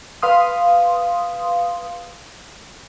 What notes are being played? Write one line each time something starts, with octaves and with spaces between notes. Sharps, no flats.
B4 F5 C6 D#6